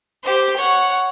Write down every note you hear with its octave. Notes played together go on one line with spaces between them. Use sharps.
G4 C5
C#5 F#5